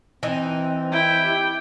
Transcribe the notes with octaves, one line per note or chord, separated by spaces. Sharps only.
E3 C4 D#4
E4 G5
G4